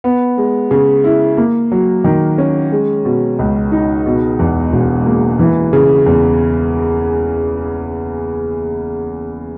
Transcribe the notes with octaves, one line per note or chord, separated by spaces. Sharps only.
B3
G#3
C#3
E4
A#3
F#3
D#3
C#4
G#3
B2
C#2
D#4
B2
E2
E1
A#3
E3
C#3
E2